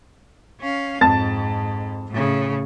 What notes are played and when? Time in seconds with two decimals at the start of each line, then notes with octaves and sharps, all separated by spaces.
0.60 C#4 F5
1.01 F2 G#2 A5 A6
2.10 A2 C#3